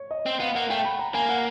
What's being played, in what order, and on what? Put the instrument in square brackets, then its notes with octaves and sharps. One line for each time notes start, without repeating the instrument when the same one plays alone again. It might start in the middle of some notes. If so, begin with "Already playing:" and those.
Already playing: [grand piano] C#5
D#5
[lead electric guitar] C4
[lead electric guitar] B3 [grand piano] F5
[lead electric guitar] A#3 [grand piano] F#5
[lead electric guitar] A3 [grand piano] G5
[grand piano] B5
A#5
[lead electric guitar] A#3 [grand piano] G#5
[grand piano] F#5